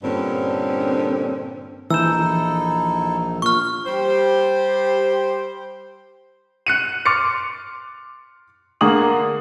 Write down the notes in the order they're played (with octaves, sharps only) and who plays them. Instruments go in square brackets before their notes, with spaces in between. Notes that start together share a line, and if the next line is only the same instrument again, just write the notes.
[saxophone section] G2 A#2 D3 C4 C#4
[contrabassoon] A#1 [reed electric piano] E3 G6 [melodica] D#4 E4 A4 [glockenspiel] E6 E7
[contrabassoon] A#2 [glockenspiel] C#6 F6
[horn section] G3 G4 C5
[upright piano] F#6 C#7 D#7
C6 D6 F6 A6 C#7
D3 A#3 G#4 D#6 F#7